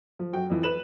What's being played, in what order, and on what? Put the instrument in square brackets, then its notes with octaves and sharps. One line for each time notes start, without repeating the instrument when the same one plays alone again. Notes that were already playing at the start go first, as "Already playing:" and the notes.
[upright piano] F3
F#2 F#4 G5
F2 E3 F3
B4 E7 F#7